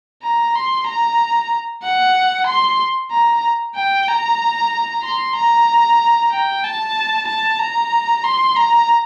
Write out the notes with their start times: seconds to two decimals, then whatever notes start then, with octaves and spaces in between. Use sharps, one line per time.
0.23 A#5
0.55 C6
0.87 A#5
1.83 F#5
2.47 C6
3.11 A#5
3.76 G5
4.08 A#5
5.03 C6
5.36 A#5
6.32 G5
6.64 A5
7.28 A5
7.60 A#5
8.24 C6
8.56 A#5